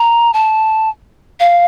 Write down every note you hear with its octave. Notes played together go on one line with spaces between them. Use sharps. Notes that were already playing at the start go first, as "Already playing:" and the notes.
Already playing: A#5
A5
F5